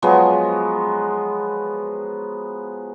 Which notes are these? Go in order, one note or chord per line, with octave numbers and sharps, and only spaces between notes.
F3 F#3 G#3 B3